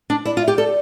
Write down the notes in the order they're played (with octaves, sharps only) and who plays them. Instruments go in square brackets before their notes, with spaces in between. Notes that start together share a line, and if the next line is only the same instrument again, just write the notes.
[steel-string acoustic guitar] D4
[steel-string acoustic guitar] E4 [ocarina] D5
[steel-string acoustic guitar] F4
[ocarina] E5
[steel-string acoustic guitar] G4
[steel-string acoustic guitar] A4 [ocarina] D5